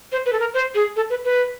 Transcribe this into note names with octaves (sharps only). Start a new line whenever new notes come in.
C5
B4
A4
A#4
C5
G#4
A4
B4
B4